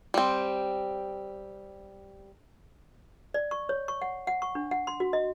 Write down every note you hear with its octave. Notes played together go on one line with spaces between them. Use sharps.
G3 C4
D5
C#6
C#5
C#6
F#5
F#5
C#6
D4
F#5
C6
F#4
D#5